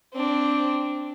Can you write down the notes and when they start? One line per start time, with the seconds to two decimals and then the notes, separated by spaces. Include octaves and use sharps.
0.13 C4 D4